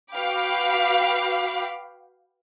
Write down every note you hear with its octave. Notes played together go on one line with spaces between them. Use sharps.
F#4 B4 F5 G5 B5 D6